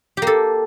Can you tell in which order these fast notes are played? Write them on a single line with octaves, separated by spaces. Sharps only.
G4 A#3 A4